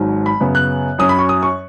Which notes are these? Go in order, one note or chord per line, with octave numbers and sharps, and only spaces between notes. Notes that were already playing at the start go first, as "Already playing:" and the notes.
Already playing: G#1 G#2 F#3
B5
F#2 C#3 B3
F#6
F#2 F#3 C#4 D#6
B5
C#6
D#6
C#6